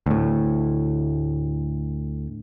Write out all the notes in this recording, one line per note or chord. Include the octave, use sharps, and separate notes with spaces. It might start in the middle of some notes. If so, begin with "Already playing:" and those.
D2 A2